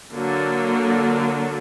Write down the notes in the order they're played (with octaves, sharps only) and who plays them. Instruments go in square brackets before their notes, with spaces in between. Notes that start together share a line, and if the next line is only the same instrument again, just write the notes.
[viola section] D3 F#3 A#3